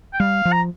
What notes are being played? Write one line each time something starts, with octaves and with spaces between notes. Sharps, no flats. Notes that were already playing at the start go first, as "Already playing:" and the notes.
G5
G3 F5
F3
A#5